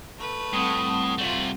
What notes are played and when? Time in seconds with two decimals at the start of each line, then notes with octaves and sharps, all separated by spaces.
0.18 A3 B4
0.53 A2 G3 C4 F#5 D#6
1.18 C3 A3 F4 F#4 F#7